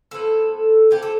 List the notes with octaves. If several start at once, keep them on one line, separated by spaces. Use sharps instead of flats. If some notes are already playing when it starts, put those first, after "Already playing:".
A2 F3 B3 E4 A4
F3 A3 E4 G4
A4